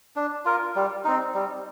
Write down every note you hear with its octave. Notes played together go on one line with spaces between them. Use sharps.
D4
F4 A#4
G3
C4 D#4
G3